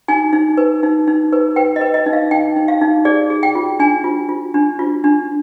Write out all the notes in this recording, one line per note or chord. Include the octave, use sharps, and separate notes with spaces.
D#4 G#5
D#4
B4
D#4
D#4
B4
B4 G5
D#5
B4
D#5
D#4
F5
D#4 G5
D#4
F5
D#4
G#4 D5
G#4
G5
F4
D4 G#5
F4
F4
D4
F4
D4